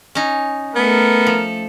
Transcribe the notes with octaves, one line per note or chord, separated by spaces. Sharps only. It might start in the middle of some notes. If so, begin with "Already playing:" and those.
C#4 D#4
A3 B3 A4 A#4
F3